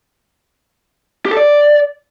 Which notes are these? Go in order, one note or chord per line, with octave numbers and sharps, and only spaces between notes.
G4
A4
D5